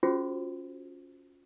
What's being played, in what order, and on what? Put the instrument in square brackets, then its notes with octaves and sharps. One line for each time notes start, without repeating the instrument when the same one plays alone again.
[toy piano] C#4 F4 F#4 G#4 C5